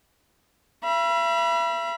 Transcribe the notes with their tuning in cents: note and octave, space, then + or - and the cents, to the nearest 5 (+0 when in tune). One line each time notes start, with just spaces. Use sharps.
E5 +40 B5 -25